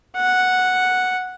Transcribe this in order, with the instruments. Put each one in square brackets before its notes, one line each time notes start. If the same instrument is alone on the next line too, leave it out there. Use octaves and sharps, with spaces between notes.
[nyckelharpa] F#5